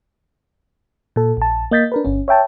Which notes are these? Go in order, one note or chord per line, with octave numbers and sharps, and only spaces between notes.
A#2 A4
A#1 A5
A#3 D#5 G6 A6 B6
D4 A#4 B4
G1 C#4
C#5 E5 G5 A5